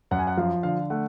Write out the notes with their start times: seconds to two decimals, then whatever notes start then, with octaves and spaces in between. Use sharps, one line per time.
0.11 F#2 F#5
0.19 G#5
0.27 F#5
0.37 F3 F5
0.63 D3 F5
0.90 A3 F#5